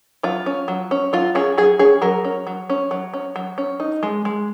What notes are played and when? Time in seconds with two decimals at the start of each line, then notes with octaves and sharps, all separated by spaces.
0.23 F#3 F4
0.46 C#4
0.68 F#3
0.91 C#4
1.13 F#3 F4
1.35 C#4 G#4
1.58 F#3 G#4
1.79 C#4 G#4
2.02 F#3 A#4
2.25 C#4
2.47 F#3
2.70 C#4
2.91 F#3
3.14 C#4
3.36 F#3
3.58 C#4
3.80 D#4
4.03 G#3
4.25 G#3